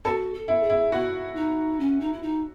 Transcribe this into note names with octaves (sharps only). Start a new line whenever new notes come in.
F#4 A4
A4
E4
G#4
E4
E4 F#4
D#4
C#4
D#4
E4
D#4